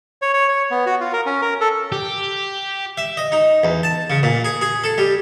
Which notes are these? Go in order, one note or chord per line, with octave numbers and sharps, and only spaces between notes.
C#5
C#5
C#5
B3
F#4
F4
A#4
C#4
A#4
A4
G4
E5
D#5
D#4
E2
A5
C#3
A#2
G#4
G#4
A4
G3